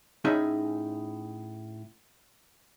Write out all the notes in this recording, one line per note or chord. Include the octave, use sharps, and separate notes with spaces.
A2 C#4 D#4 G#4 E5